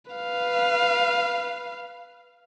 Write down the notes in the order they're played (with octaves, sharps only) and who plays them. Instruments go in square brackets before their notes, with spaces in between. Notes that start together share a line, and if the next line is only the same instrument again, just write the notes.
[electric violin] B4 F5